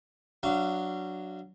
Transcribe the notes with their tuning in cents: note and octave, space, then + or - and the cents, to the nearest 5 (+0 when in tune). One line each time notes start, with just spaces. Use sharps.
F#3 +0 D4 +0 F5 -30